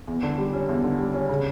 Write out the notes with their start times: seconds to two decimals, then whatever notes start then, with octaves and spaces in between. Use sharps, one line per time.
0.08 E2
0.23 D3
0.38 G3
0.53 C#4
0.69 E2
0.84 D3
0.99 G3
1.14 C#4
1.29 C#3